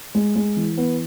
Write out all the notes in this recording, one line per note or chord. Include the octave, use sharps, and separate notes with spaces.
G#3
G#3
E3
B3